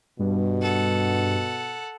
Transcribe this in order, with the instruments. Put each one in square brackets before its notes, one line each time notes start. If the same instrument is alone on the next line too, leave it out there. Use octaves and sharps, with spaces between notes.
[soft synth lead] G2 [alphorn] B2
[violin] A4 F#5